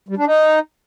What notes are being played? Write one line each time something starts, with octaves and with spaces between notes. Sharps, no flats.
G3
D4
D#4